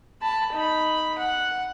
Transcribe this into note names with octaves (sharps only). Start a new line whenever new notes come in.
A5 B5
D#4 B5
F#5